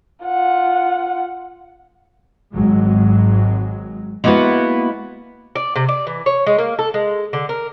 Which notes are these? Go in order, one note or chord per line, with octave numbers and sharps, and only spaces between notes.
F4 F#5
G#1 G#2 F#3 G#3
G#3 A#3 B3 E4 F#4 B4
D5
C3
D5
E3
C#5
G#3
A#3
A4
G#3
D3
A#4